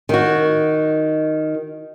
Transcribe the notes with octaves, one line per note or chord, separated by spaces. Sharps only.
D#3 F#4